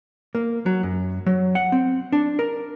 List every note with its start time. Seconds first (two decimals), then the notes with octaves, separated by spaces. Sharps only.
0.35 A#3
0.66 F#3
0.83 F#2
1.26 F#3
1.55 F#5
1.72 C4
2.12 D4
2.39 A#4